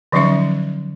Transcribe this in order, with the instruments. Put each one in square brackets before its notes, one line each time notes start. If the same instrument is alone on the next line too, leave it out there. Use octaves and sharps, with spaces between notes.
[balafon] D3 F3 F#3 C#4 D#4 E5